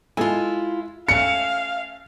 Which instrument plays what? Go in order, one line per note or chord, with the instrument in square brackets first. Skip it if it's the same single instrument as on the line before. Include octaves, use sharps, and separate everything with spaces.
[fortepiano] G#3 A4 G#5 [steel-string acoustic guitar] E4 F4
[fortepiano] A3 C#4 [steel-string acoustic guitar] E5 [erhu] F5 [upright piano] C#7